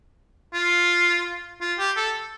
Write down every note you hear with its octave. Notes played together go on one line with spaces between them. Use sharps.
F4
F4
G4
A4